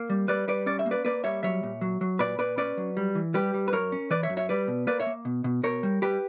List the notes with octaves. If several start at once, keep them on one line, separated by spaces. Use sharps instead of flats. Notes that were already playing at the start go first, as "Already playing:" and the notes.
Already playing: A#3
G3
G3 B4 D5
G3 B4 D5
C#4 D5
E5
A#3
B4 D5
A#3 B4 D5
G3 C#5 E5
F#3 C#5 E5
A#2
F#3
F#3
A#2 B4 D5
A#2 B4 D5
C#4 B4 D5
F#3
G3
E3
G3 G4 B4
G3
B4
F#2 A#4 C#5
C#4
E3 B4 D5
C#5 E5
F#2
C#5 E5
G3 B4 D5
B2
A#3 B4 D5
C#5 E5
A#3
B2
B2
B2 A#4 C#5
G3
G3 G4 B4